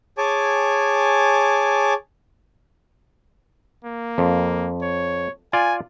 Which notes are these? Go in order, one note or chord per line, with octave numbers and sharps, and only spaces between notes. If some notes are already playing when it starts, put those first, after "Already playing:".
G#4 C#5 G#5 A5 D6
A#3
F2
C#5
F4 D5 G#5